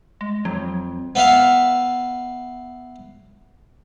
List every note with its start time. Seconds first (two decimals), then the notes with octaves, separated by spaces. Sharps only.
0.21 G#3
0.45 F2 F#3
1.15 B3 E5 F5